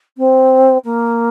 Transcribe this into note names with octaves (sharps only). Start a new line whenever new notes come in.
C4
A#3